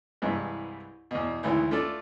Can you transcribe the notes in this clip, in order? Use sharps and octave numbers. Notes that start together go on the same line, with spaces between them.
C2 G2 E3 G#3
E2 B2
G#1 D2 E3 E4
A3 D4 F4 A4 D5